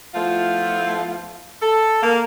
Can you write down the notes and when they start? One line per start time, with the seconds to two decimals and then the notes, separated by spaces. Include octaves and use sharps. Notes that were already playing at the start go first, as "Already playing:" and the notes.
0.15 F3 A3 B3 E4 F4
1.62 A4
2.03 A#3